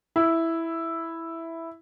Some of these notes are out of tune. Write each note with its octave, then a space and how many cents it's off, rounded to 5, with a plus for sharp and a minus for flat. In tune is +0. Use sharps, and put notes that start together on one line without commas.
E4 +0